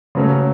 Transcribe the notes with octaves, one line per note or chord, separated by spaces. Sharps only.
C#3 F#3 A3 C#4